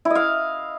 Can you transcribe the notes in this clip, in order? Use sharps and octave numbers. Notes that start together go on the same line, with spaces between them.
E4
D#5
F5